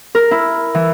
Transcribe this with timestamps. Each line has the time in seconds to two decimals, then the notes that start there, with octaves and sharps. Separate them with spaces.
0.15 A#4
0.31 E4
0.75 E3